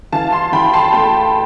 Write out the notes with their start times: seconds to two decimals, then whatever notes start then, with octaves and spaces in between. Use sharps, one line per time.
0.13 E3 F5 A5
0.32 A5 C6
0.52 E3 G5 B5
0.74 A5 C6
0.93 A3 G5 B5